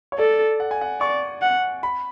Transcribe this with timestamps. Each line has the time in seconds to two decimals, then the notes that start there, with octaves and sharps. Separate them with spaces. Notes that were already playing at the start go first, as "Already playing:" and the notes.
0.12 C#5
0.18 A4 D5
0.60 F#5
0.71 G#5
0.81 F#5
1.01 D5 C#6
1.42 F#5
1.83 B5